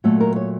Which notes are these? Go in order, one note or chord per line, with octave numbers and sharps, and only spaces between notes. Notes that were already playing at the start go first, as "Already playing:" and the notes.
A#2 F#3 A3 A4
A#4
C#5